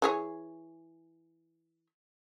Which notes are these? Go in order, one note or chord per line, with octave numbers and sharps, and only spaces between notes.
E3 G#4 C#5